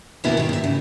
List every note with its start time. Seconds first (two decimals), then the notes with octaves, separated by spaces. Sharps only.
0.24 D#2 B2 E3 A#3 B3 E4
0.37 D#3 G4
0.49 G2 E5
0.64 C#3